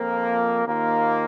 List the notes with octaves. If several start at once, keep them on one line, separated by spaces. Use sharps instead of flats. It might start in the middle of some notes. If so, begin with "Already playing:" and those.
Already playing: F2 F3 A#3
D#2 D#3 A#3 F4